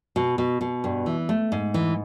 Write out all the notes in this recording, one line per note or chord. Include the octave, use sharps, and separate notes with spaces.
B2
B2
B2
G2
E3
A3
G#2
E3